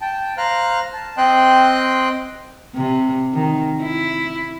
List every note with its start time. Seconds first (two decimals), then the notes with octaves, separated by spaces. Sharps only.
0.01 G5 A5
0.37 C5 F5 A#5 F6 F#6
0.93 A5
1.17 C4 D#5 G5 C6 F#6
2.75 C3
3.33 D#3
3.82 E4